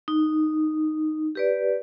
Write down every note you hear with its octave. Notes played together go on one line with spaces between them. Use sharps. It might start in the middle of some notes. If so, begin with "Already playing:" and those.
D#4
G4 B4 D5